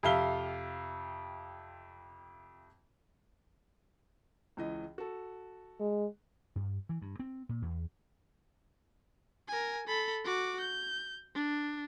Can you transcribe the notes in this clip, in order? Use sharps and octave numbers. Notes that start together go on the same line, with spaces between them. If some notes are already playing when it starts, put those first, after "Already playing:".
F2 C3 E5 F5 G7
C#2 E3 D#5
F#4 A4
G#3
G2
E3
G2
C4
A#2
E2
A#4 G#5
A4 B5
F#4 D6
G6
D4